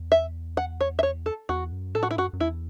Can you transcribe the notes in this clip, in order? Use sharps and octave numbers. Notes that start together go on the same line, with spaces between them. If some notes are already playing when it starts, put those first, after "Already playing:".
Already playing: E2
E5
F#5
C#5
E5
C#5
A4
E2 F#4
F#2
A2 A4
F#4
E4
F#2 F#4
F#2
E2 E4